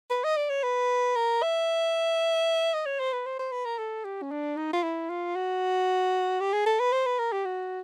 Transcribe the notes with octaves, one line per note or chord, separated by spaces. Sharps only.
B4
D#5
D5
C#5
B4
A#4
E5
D#5
C#5
C5
B4
C5
C5
B4
A#4
A4
G4
C#4
D4
D#4
F4
E4
F4
F#4
G4
G#4
A4
B4
C5
B4
A#4
G4
F#4